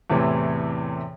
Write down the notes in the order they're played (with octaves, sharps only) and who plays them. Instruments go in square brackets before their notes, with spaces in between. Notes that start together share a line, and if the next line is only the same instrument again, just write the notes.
[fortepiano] E2 A2 C3 E3